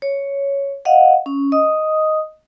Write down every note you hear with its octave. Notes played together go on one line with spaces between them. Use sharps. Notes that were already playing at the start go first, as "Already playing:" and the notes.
C#5
D#5 F5 F#5
C#4
D#5 D#6